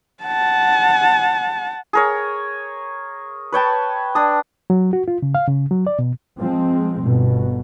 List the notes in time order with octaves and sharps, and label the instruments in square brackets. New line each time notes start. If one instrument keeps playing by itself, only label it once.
[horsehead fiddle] F#5 A5
[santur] G#4 A#4 C#5
B4 C#5 G5 A5
D4 D#6
[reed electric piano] F#3
F#4
F4
C#3
F5
C#3
F#3
D5
B2
[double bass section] F3 G#3 C4
G1 B2